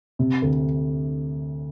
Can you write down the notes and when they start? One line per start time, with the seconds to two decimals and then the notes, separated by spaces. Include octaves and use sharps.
0.19 C3
0.42 D2